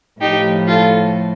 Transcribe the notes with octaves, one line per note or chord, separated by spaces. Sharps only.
A2 F3 D#4 G4
F4 A4